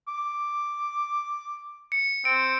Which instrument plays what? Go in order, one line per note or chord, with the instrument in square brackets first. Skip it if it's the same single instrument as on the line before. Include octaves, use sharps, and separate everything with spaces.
[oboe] D6
[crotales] C#7
[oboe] C4 [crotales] D7